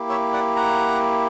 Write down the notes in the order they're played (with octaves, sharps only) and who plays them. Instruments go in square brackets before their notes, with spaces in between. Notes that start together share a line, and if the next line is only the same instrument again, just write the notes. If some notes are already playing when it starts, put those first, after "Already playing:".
Already playing: [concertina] A#3 E4 G4
C#5 E5
D5 F#5
F#5 A#5